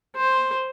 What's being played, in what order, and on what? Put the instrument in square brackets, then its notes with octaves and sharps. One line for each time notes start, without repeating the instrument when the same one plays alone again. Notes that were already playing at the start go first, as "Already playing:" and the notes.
[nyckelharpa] C5